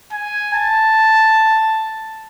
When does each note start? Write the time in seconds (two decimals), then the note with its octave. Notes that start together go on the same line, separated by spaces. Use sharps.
0.12 G#5
0.54 A5